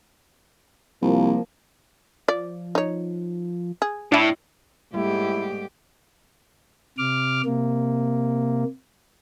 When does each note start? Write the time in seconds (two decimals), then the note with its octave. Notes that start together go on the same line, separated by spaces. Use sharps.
1.02 C2 F3 A#3
2.28 F3 D5
2.75 D#4 C#5
3.82 G#4
4.12 A2 D4 E4
4.94 G#2 G3 A3 A#3 E4 G4
6.98 C3 D6 F6
7.45 C3 A#3